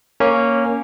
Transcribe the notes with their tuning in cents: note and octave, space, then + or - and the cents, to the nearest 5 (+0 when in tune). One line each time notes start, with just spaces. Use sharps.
A#3 +0 C#4 +0